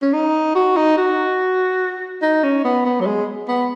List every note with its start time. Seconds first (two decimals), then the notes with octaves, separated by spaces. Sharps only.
0.02 C#4
0.13 D#4
0.55 F#4
0.77 D#4
0.97 F#4
2.22 D#4
2.44 C#4
2.64 B3
2.85 B3
3.00 F#3
3.06 G#3
3.48 B3